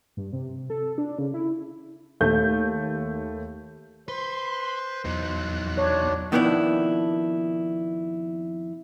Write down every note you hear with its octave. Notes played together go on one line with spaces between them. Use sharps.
G2
C3
A4
D4
C#3
E4
D#2 A3 G6
B4 C5 C6
E2 F#3 D#4 F#6
D4 C#5
F2 B2 D#3 B3 D4 E4